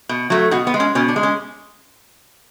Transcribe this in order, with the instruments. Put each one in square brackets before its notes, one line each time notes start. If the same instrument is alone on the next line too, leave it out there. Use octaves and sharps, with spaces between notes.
[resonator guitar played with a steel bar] B2
F#3 A3
B2 F#4
B3
G#3
C#4
B2 C#4
D4
G#3
C#4